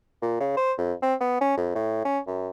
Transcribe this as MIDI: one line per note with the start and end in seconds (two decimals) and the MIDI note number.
0.22 0.40 46
0.40 0.55 49
0.57 0.73 72
0.78 0.93 41
1.03 1.14 60
1.20 1.41 59
1.41 1.56 61
1.57 1.73 41
1.75 2.03 45
2.05 2.19 61
2.27 2.49 42